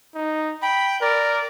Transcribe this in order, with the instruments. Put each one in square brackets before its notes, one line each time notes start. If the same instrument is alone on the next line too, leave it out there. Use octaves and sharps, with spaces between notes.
[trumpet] D#4
[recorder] G5 [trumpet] B5
[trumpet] A#4 [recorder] D5